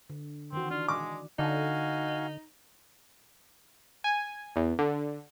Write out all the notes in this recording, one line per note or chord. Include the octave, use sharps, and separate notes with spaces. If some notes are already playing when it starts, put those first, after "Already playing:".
D3
D#3 E3 C4 F#4
D4 F4
G#3 D6
D3 D#4 F#4 F5 G#5
G#5
E2
D3